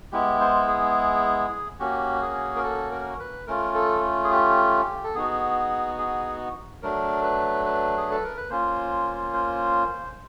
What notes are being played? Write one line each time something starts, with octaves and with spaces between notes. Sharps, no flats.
G#3 B3 E4 G4
C5
G#4
A#3 C#4 F#4 G4
G#4
A#4
A4
A#4
B4
A3 C#4 F4 A#4
A4
G#4
G4
A4
B3 D#4 F#4 G#4
G#4
F#3 A3 D4 A#4
B4
B4
G#4
A4
A#4
B4
A#3 C#4 F4 C5
C5